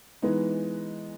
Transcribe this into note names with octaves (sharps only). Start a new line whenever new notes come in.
E3 G#3 B3 D#4